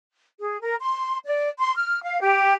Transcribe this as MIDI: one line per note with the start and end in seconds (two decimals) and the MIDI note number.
0.38 0.58 68
0.61 0.76 70
0.81 1.18 84
1.24 1.48 74
1.59 1.73 84
1.75 2.02 89
2.03 2.18 77
2.22 2.54 67